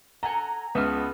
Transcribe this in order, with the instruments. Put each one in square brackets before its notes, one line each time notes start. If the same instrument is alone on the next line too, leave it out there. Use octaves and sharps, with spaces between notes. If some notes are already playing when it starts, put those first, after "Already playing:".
[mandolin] A4 F#5 G#5 [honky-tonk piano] A#5
[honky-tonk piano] C#2 D#6 [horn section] B3 [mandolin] E5 A5 F6